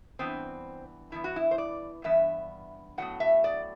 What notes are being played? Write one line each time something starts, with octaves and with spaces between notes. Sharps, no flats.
G2 E3 B3 C4
G2 E3 B3 E4
F#4
E4
C5
D5
G2 E3 B3 E5
A2 F#3 B3 F#5
E5
D5